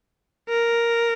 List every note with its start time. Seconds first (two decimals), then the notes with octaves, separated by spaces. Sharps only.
0.49 A#4